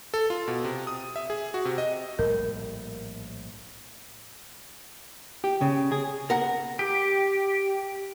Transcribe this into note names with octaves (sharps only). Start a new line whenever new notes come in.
A4
F4
B2
C3
D#6
E5
G#4
F#4
C3
D#5
A#1 A2 G3 A#4
G4
C#3
G#4
A#4 F#5 A#5
G4